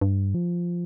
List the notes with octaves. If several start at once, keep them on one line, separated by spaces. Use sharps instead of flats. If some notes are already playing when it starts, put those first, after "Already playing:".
G2
F3